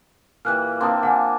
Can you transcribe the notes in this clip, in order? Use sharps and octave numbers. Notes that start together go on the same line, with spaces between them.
A#2 E3 G3 F6 F#6
A#3 C4 D4 C6 D#6
F4 F#5 G#5